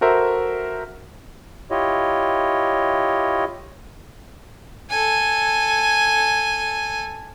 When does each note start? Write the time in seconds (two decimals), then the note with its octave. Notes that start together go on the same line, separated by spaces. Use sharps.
0.01 F#4 A4 A#4 C5 E5
1.71 E4 F4 G4 C#5 D#5
4.90 A4 G#5